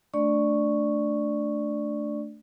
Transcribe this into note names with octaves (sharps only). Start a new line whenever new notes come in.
A3 D4 D5 C#6